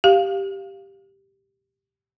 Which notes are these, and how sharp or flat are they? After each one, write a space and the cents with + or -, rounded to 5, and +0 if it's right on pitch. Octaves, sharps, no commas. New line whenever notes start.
G4 +0 F5 +0